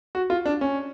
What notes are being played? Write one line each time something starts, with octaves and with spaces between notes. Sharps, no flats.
F#4
F4
D4
C#4